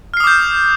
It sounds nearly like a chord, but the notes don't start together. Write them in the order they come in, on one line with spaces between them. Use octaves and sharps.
F6 C7 D#6 D6 G6